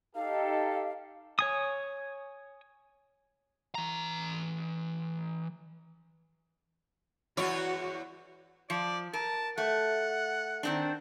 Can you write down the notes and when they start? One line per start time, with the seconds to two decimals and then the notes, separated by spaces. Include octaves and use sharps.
0.15 D#4 G4 A4 F5
1.39 C#5 G#5 D#6
3.75 E3 A#5
7.37 E2 E4 F#4 C#5
8.70 F3 D5
9.13 A#4 A5
9.58 A3 F#5
10.63 D#3 C4 D4